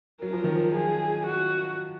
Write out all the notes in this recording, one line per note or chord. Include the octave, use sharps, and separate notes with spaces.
F#3 A#4
F3
D#3
F3
F3 G#4
F#4